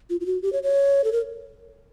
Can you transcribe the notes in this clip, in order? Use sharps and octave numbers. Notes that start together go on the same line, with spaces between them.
F4
F4
F#4
G4
C#5
C#5
A4
A#4